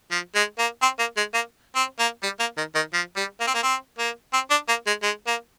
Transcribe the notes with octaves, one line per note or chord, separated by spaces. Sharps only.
F3
G#3
A#3
C4
A#3
G#3
A#3
C4
A#3
G3
A#3
D#3
D#3
F3
G3
A#3
C4
A#3
C4
A#3
C4
D4
A#3
G#3
G#3
A#3